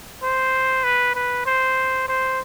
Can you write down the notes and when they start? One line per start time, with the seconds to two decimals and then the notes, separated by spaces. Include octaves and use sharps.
0.23 C5
0.84 B4
1.15 B4
1.46 C5
2.08 C5